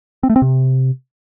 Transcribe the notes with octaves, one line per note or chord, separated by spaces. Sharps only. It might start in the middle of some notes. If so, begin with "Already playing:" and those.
C4
A3
C4
C3